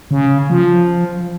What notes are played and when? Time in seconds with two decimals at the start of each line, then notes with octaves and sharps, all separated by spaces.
0.11 C#3
0.50 F3